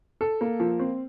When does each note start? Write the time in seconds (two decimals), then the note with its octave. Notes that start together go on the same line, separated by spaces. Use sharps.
0.21 A4
0.41 A#3
0.60 F3
0.79 C4